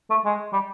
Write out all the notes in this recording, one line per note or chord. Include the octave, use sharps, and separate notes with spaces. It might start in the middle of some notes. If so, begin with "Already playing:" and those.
A3
G#3
G3